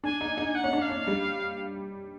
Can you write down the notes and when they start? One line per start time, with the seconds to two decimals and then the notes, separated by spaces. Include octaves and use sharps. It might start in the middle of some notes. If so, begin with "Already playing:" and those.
0.04 D4 G#5
0.21 D#4
0.37 D#4
0.55 F#5
0.64 C#4
0.73 D4
0.82 F5
0.89 C#4
1.07 G3